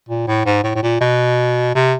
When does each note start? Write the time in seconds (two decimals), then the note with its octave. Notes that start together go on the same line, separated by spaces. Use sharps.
0.09 A#2
0.27 A2
0.46 G#2
0.63 A2
0.75 A2
0.83 A#2
1.01 B2
1.75 C3